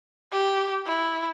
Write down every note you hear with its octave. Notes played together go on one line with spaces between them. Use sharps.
G4
E4